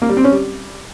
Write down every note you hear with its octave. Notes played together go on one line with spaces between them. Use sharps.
A#3
G3
C4
C#4
G3